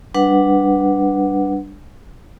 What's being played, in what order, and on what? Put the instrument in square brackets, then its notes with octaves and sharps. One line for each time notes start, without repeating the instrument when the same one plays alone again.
[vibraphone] G3 D4 B4 F#5